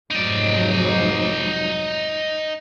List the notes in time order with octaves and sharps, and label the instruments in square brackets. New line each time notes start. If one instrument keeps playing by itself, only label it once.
[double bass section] F1 G#2 F#3 [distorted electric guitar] D#4 D5